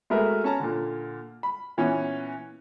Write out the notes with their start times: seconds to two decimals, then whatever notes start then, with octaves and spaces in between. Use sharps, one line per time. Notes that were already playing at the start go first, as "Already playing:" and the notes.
0.10 G#3 A3 F#4 A#4 B4 E5
0.44 C#4 A5 A#5
0.60 A#2 D3
1.43 B5
1.77 A#2 E3 B3 C#4